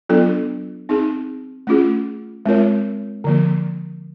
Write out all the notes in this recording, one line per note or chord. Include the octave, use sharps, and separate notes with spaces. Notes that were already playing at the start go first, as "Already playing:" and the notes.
F#3 B3 D4 F4 A4
C4 D#4 G#4
A3 C#4 F4 G#4
G#3 C4 F4 A#4 C#5
D3 F3 A#3